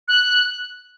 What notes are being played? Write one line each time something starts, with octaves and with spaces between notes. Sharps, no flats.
F#6